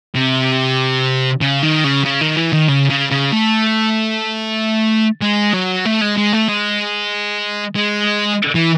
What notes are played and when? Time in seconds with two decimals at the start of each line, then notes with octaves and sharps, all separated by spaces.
0.15 C3
1.41 C#3
1.63 D#3
1.84 C#3
2.05 C#3
2.21 D#3
2.37 E3
2.53 D#3
2.69 C#3
2.90 C#3
3.11 C#3
3.32 A3
5.22 G#3
5.54 F#3
5.86 A3
6.02 G#3
6.18 G#3
6.33 A3
6.49 G#3
7.75 G#3
8.55 E3